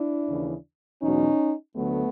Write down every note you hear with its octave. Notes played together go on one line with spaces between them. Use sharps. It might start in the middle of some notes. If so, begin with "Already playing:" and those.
Already playing: D4 E4
D#2 C#3 E3
E2 B2 F#3 C#4 D#4
D2 D3 F#3 A3 B3